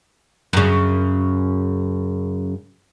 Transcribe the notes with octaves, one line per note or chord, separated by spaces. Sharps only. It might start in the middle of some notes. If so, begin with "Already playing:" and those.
F#2 C#3